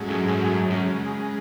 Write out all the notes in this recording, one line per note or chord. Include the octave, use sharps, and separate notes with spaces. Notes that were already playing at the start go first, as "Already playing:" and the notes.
Already playing: G#2 F#3 A3 C#4 G#4
F#2
F#2
F#2
C#3 G#3